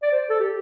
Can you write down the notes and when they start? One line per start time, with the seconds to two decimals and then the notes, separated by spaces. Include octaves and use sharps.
0.03 D5
0.12 C5
0.30 A4
0.40 G4